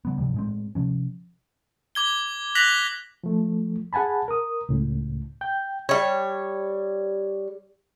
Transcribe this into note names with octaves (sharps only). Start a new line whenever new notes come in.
C#3 F#3 B3
G2 C3 F3 G3
A2 G#3 C4
C3 F3 C#4
D6 G#6 G7
F#6 A#6 B6 F7 F#7
F3 A3
G#4 F#5 G#5 A5 B5
A#4 D#6
C#2 A2
G5 G6
G3 C#5